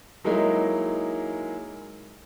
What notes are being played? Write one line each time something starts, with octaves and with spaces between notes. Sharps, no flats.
F#3 G#3 A#3 D#4 E4